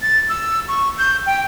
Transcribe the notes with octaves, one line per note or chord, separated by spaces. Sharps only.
A6
E6
C#6
G6
G5